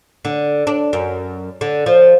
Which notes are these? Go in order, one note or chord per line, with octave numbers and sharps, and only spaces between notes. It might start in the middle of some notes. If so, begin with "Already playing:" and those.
D3
D4
F#2
D3
F3